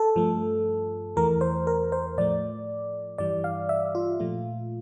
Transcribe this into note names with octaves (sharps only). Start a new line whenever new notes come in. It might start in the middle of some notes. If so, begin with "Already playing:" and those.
Already playing: A4
G2 F3 A3
E2 E3 A3 A#4
C5
A#4
C5
A2 F3 A3 D5
G2 E3 G3 D5
F5
E5
F4
A#2 F3 A3